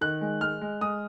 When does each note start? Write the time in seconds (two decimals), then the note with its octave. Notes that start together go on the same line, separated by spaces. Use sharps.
0.01 D#3 F#6
0.21 G#3
0.41 G#3 F6
0.61 G#3
0.81 G#3 D#6